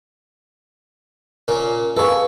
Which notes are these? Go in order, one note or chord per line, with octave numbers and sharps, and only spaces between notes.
A#2 A#3 C#4
G#4 A4 B4 F5 C#6